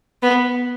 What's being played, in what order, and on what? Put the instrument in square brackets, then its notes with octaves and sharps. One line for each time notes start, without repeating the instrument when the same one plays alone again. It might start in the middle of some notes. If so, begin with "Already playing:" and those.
[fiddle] B3